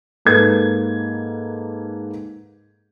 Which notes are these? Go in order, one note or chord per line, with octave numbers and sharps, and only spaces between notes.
G#2 A#3 A4 B4 G#6